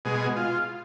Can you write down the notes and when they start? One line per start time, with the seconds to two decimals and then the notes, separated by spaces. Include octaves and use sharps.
0.05 B2 G#3 G#4
0.36 F4